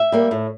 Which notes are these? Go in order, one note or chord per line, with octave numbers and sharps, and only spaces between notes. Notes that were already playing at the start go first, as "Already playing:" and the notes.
Already playing: E5
G3 A#3
A2